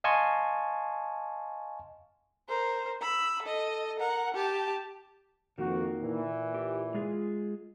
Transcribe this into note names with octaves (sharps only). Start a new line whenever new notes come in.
D#5 F5 G#5 A5 C6 C#6
A#4 C5
B5 E6
A4 D#5
A#4 F#5
G4 A5
F2 D#3 A#3 F#4
A#2 E3
G4
G#3 F4 G#4